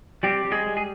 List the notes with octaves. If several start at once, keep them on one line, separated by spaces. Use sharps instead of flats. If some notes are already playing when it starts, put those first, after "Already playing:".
G3 C4 G4
G3
G#3 G#4
G3
G#4